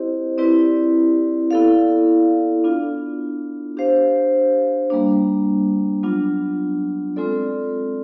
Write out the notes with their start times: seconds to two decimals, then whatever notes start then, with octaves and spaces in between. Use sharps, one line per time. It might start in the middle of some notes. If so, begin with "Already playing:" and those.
Already playing: C4 E4 G4 C5 D#5
0.38 C4 E4 G4 B4 D5
1.51 B3 E4 A4 D5 F5
2.64 B3 D4 F4
3.77 D4 G4 C5 F5
4.90 G3 A#3 D4
6.03 F#3 B3 D4 F4
7.16 G#3 C4 F4 A4 D5